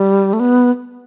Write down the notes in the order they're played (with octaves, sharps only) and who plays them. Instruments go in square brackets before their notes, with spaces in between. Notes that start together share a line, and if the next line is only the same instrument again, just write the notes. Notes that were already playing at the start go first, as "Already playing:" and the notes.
Already playing: [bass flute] G3
A3
B3